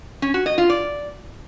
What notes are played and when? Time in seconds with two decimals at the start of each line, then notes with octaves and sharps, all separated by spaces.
0.22 C#4
0.34 F#4
0.46 D#5
0.58 F4
0.70 D5